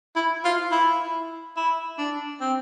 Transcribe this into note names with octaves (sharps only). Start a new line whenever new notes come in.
E4
F4
E4
E4
D4
C4